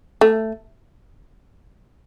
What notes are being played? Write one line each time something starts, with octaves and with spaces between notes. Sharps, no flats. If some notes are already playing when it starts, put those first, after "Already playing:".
A3